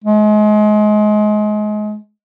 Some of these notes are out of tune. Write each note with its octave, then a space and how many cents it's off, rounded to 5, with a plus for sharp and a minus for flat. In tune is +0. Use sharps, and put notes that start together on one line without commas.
G#3 +30